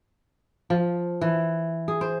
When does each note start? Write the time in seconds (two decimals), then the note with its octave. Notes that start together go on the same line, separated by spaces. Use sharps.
0.70 F3
1.21 E3
1.88 G#4
2.01 C5